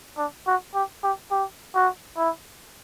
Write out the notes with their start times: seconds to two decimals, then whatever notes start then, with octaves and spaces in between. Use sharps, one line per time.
0.18 D4
0.47 F#4
0.74 G4
1.04 G4
1.31 G4
1.75 F#4
2.17 E4